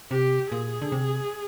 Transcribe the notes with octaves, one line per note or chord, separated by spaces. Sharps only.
C3 G4
A#2 G#4
D3
C3